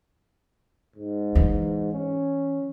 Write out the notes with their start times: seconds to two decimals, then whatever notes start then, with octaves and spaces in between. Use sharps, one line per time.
0.96 G#2
1.35 E3
1.93 C#4